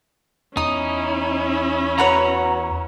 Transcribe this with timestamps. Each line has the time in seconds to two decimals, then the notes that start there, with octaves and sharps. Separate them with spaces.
0.57 E2 C#4 D#4 E4 D#6
1.98 F#4 B4 C#5 A#5